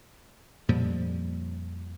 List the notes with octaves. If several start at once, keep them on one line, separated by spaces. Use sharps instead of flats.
F2 A#2 F3 G3